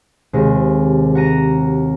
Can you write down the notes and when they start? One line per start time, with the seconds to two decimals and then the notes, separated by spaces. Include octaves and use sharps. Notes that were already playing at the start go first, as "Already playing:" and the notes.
0.33 D#2 C3 G#3
1.15 F#4 A#5 D#7